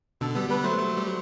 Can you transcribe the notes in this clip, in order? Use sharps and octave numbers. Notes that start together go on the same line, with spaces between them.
B2 D3 A4
G3 B3 A4
G3 B3 B4
F#3 A3 C5
F#3 A3
G3
F#3